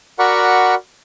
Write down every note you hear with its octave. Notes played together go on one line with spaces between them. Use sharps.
F#4 A#4 D5 F#5 B5 C#6